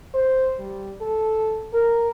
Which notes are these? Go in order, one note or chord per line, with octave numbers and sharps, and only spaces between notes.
C5
G3
A4
A#4